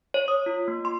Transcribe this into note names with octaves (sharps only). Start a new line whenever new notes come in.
C#5
D#6
F4
A#3
C6